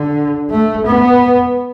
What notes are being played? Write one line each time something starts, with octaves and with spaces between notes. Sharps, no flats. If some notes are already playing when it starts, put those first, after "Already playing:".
Already playing: D3
A3
B3